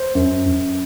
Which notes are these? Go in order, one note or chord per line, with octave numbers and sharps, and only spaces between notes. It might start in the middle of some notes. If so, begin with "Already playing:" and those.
Already playing: C5
F#2
F#2